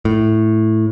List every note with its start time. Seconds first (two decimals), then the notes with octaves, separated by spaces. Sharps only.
0.05 A2